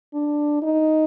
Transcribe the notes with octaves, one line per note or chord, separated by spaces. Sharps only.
D4
D#4